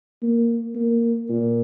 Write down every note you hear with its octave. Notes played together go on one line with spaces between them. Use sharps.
A#3
A#3
A#2